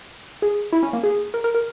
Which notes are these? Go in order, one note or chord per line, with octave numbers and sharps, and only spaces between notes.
G#4
E4
C#4
A#3
G#4
A#4
A#4
A#4